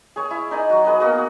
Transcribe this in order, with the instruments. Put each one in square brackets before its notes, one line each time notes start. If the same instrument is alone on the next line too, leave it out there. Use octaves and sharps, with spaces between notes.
[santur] G#4 C#5
E4
D#4 D5 G#5
F#3 F#4
G#4 B4 D#5
A#3 B3 F#4 G#4